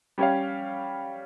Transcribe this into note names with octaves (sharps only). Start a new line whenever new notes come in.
G3 C#4 G4 C#5 F5